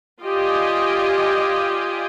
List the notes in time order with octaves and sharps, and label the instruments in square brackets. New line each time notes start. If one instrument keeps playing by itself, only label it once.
[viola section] F4 G4 D5 D#5 G5 G#5